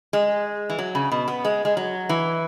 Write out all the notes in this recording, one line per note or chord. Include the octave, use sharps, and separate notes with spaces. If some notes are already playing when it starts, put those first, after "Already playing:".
G#3
E3
F#3
C#3
B2
B3
G#3
G#3
F#3
E3